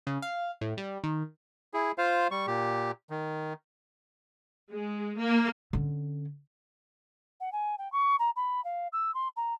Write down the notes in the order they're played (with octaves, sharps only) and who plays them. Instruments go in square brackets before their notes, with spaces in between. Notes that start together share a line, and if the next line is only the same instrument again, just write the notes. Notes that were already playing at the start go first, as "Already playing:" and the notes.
[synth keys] C#3
F5
A2
G3
D#3
[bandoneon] E4 G#4
F4 C5 F5
G3 C#6
A#2 G4
D#3
[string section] G#3
A#3
[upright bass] D3 C#4
[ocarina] F#5
G#5
G5
C#6
A#5
B5
F5
E6
C6
A#5